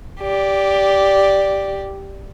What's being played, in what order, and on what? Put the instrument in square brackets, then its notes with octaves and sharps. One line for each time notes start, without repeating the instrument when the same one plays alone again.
[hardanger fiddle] G4 D5